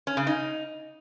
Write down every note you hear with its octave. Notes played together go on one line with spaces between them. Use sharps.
C#4
C#3
D#4